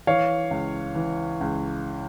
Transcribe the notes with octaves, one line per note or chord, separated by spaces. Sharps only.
E3 C#5 F5
C#2
E3
C#2